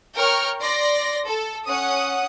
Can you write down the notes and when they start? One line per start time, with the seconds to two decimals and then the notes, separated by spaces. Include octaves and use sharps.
0.16 A#4 C#5 G5 C#6 F6
0.61 D5 C6 A#6
1.27 A4
1.66 C#4 F#5 D#6